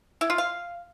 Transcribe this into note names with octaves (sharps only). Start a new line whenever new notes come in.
E4
F4
F5